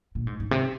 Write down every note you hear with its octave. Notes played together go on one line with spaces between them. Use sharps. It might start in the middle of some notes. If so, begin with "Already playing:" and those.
A#2
G#2
G#2
C3